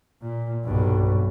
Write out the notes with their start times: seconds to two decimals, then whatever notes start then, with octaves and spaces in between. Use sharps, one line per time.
0.22 A#2
0.65 B1 G2